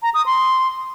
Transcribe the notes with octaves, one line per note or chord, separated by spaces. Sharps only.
A#5
D#6
C6